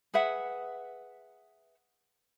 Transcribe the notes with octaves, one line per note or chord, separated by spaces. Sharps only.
G#4 B4 E5 F#5